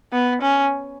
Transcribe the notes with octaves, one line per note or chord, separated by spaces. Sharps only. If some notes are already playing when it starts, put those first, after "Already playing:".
B3
C#4